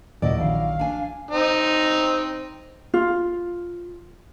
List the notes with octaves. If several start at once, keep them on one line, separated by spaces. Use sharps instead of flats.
D#2 A#2 E3 F#3 E4 D5 D#5
A#1 D#3 F3 F5
D4 G#5
C4 D#4
F4